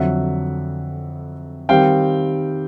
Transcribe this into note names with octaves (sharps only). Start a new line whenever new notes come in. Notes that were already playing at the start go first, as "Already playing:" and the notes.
Already playing: F2 D3 F#3 E5 F#5
D#3 G3 C4 F5 G5